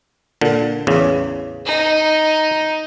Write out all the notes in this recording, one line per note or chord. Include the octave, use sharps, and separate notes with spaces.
A#2 D3
A1 E2 C#3
D#4